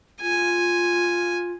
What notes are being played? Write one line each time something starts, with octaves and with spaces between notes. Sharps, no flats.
F4 G#5